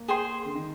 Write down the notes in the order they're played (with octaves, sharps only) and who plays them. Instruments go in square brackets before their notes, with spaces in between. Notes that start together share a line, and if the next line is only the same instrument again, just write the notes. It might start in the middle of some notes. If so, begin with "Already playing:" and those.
Already playing: [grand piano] A#3
[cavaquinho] G#4 C5 G5 C6
[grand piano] D3
D#3